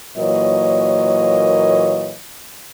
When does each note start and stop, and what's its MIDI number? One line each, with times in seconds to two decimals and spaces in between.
0.17 2.15 46
0.17 2.15 52
0.17 2.15 54
0.17 2.15 58
0.17 2.15 73
0.17 2.15 75